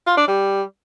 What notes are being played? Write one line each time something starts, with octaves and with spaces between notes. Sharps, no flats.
F4
D4
G3